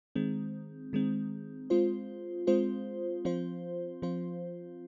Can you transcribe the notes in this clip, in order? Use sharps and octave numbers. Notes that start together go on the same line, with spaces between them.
D#3 G#3 C4
D#3 G#3 C4
G#3 C4 F4 C5
G#3 C4 F4 C5
F3 C4 F4 C5
F3 C4 F4 C5